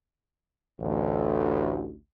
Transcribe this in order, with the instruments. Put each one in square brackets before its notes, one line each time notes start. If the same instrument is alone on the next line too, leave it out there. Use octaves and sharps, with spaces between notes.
[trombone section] A1 D2